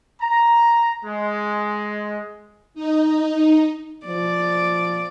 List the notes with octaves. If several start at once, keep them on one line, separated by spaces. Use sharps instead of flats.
A#5
G#3
D#4
F3 D5